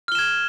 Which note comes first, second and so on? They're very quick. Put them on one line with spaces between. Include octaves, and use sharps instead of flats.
F6 G7 E7 G#6